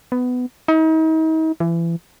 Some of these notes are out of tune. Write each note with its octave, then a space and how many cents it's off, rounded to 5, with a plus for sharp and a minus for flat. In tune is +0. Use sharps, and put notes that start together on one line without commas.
B3 +15
D#4 +40
E3 +30